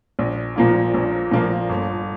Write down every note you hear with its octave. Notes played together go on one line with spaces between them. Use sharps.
A#1
A#2 F3 A#3 F4
A#1
A#2 F3 A#3 F4
G1